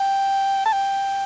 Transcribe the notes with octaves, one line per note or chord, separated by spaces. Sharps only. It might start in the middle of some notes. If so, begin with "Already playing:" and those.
Already playing: G5
A5
G5